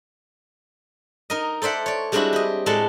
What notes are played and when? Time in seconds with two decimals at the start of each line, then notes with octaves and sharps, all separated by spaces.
1.30 D#4 A#4 D#5
1.62 A4 C5 D5 E5 F#5
1.86 C#5 D5
2.12 G3 G#3 C4 D4 E4 F#4
2.33 G4 D#5
2.66 A2 G#3 A4 D5 F#5 A5